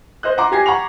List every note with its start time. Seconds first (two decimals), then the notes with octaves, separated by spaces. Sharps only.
0.23 C5 D#5 F#6
0.37 F4 F#5 A#5 C6 D6
0.52 G4 G#5 G#6 A#6 C7
0.66 F#5 A#5 B5 C#6 F7